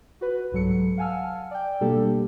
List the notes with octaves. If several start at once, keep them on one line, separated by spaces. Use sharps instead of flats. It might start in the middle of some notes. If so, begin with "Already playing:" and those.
F#4 B4
C2 G#2 F#3 A4 C#7
F5 F#5 G#5 A5 E6 F6
D5 G5
B2 G3 A#3 D4 G4 A4